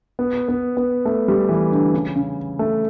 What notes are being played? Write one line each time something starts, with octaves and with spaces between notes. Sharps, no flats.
B3
B3
B3
A3
G3
E3
D3
C#3
C#3
A3